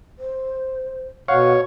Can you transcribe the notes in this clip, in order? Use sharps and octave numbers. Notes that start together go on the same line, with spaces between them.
C5
B2 C#5 F5 F#5 C#6